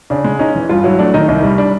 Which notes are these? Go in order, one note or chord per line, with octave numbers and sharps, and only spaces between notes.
C#3 D4
G#3
C#4 D#4
E3
G2 F4
F#3 E4
A3 D4
D#3 D#4
C2 D#4
G3
D4